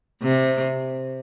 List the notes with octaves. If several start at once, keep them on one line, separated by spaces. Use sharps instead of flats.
C3